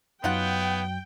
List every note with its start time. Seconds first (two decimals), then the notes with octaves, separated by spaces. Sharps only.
0.24 F#2 F#3 B3 D#4 F4 F#5 G5